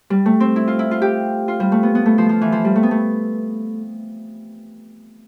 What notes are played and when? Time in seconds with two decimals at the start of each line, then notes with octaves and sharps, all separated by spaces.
0.10 G3
0.26 A3
0.40 C4
0.56 E4
0.68 F4
0.79 E4
0.91 F4
1.02 G4
1.48 F4
1.60 G3
1.72 A3
1.83 B3
1.95 B3
2.06 A3
2.18 F3
2.29 F3
2.41 E3
2.52 F3
2.65 G3
2.76 A3
2.83 B3
2.91 A3